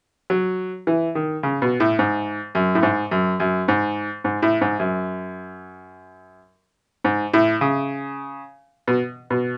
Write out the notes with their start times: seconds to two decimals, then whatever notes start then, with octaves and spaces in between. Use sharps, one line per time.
0.30 F#3
0.87 E3
1.15 D#3
1.43 C#3
1.62 B2
1.80 A2
1.99 G#2
2.55 F#2
2.75 A2
2.83 G#2
3.11 F#2
3.40 F#2
3.68 G#2
4.24 G#2
4.43 A2
4.61 G#2
4.80 F#2
7.04 G#2
7.34 A2
7.61 C#3
8.88 B2
9.30 B2